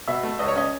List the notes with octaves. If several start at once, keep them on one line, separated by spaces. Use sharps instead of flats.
B2 E5
A3
C#2 D#5
C#5
C#4 D#5